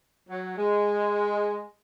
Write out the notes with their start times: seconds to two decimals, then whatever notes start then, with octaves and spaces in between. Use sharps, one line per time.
0.29 F#3
0.58 G#3